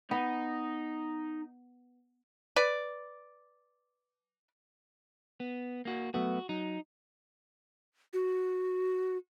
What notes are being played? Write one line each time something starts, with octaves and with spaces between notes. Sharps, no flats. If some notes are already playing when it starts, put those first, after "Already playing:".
B3 D#4
B4 D5
B3
A#3 F#4
F#3 A3 B3 F#4
F#3 D#4
F#4